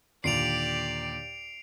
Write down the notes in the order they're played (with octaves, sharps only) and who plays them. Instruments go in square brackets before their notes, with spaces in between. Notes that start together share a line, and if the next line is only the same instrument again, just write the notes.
[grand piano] D#2 A#2 D3 [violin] G4 D5 [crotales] C7 D7 F7